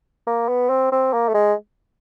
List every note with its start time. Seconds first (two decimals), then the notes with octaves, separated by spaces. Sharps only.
0.27 A#3
0.48 B3
0.69 C4
0.92 C4
1.13 A#3
1.28 A3
1.34 G#3